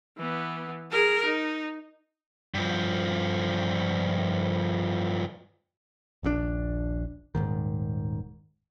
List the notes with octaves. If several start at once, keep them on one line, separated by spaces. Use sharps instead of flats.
E3 B3
G#4 A#4
D#4
G2 F3
D#1 A#1 A#2 D4
D#1 B1 G#2 D#3